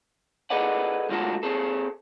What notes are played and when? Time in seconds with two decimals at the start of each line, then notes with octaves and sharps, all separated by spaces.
0.50 G#4 A4 B4 D5 D#5 F#5
1.09 D2 G#3 F4 F#4 A4
1.43 C4 G#4 A4